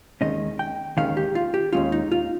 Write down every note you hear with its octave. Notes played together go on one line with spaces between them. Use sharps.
D#2 D#3 G#3 C#4 D#5
G5
D#2 D#3 G#3 C#4 F5
G4
F4
G4
D#2 D#3 G#3 C#4 F4
D#4
F4